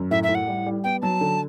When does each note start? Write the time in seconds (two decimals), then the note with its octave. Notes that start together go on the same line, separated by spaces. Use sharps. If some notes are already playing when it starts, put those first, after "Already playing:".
Already playing: F#2
0.11 A2 E5
0.23 E5
0.29 A2
0.35 F#5
0.48 G3
0.66 G3
0.84 B3 G5
1.02 F#3 A5
1.21 D3